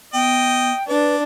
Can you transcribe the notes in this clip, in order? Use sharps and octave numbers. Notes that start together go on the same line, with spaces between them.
B3 D#5 G5
D4 B4 D5